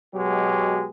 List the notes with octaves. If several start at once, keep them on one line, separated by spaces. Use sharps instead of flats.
B2 F#3 G#3 G4